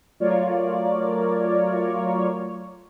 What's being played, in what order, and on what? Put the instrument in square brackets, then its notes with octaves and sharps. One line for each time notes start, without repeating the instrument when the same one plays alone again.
[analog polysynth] F#3 A3 F4 A#4 C#5 D5